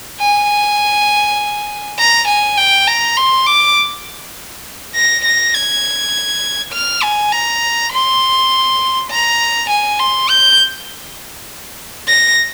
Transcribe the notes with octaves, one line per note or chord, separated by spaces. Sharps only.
G#5
A#5
G#5
G5
A#5
C6
D6
A#6
A#6
G#6
F6
G#5
A#5
C6
A#5
G#5
C6
G6
A#6